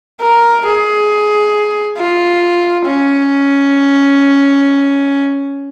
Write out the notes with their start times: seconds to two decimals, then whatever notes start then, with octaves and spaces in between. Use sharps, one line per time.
0.21 A#4
0.66 G#4
1.98 F4
2.86 C#4